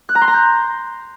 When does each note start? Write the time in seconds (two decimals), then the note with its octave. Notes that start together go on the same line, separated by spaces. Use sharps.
0.09 F#6
0.15 A#5
0.21 C6
0.28 A#5
0.34 G6